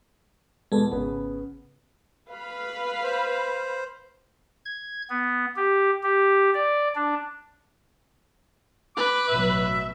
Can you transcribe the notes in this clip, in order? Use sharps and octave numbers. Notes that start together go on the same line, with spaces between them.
E2 B2 G#3 A4 B4
G#1 C#3 B3
B4 F5 B5
C5
G#6
B3
G4
G4
D5
D4
B4 D6
A1 B2 F#3 E5